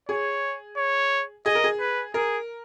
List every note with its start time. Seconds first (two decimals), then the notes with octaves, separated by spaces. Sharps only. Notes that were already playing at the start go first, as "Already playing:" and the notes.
0.09 G#4 C#5
0.77 C#5
1.46 G#4 D#5
1.55 A#4
1.64 G#4
1.80 B4
2.14 G#4 A#4